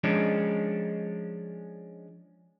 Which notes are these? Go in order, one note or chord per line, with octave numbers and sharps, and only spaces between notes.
F3 G#3 C#4 D4